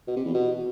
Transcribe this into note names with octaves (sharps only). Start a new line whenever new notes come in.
B2
C3
E2
B2